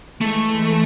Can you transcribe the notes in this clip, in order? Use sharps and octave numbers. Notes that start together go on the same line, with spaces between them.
E3 G#3 A3
E3 G#3